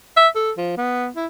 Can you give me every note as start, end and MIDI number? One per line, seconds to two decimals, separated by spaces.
0.17 0.28 76
0.35 0.52 69
0.57 0.77 53
0.77 1.08 59
1.16 1.26 64